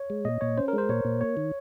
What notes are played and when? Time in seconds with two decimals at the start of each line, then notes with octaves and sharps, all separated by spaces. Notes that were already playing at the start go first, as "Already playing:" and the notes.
Already playing: C#5
0.10 G#3
0.25 A#2 D#5
0.41 A#2 C#5
0.57 C#4 C5
0.68 A#4
0.73 G#3
0.78 C5
0.89 A#2 C#5
1.05 A#2
1.21 A#3 C#5
1.37 D#3